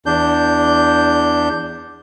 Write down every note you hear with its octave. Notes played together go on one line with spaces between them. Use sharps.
E2 D4 G6